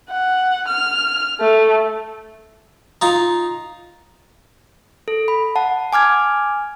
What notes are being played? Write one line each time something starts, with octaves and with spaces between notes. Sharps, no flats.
F#5
F6
A3
D#4 F4
A4
B5
F#5 A5
G#5 D6 F6 G#6